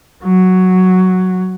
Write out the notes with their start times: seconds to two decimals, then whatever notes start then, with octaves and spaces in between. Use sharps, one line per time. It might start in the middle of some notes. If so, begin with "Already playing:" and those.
0.23 F#3